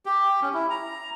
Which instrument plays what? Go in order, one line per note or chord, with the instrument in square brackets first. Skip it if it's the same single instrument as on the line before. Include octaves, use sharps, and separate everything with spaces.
[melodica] G4
C#4
E4
A#5